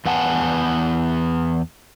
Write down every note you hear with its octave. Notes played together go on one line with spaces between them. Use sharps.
E2 B3 F#5 G#5 A5